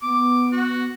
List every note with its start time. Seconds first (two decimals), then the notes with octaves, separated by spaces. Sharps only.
0.02 B3 D6
0.52 F#4